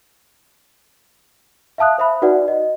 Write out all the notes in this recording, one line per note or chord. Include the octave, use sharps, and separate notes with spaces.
E5 F5 A5 D#6 F#6
C5 E5 B5
D#4 F#4 B4 D5 F#5
D#5